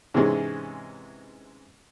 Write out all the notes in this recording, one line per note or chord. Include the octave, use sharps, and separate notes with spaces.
G#2 C3 E3 G#3 C#4 G#4